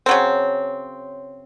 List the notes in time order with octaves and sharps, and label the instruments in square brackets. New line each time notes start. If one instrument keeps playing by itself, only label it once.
[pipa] C#3 F#3 C4